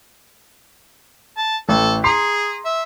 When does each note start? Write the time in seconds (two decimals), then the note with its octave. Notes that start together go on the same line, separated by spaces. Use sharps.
1.37 A5
1.69 A1 A4
2.04 G#4 A#5 C6 C7
2.65 E5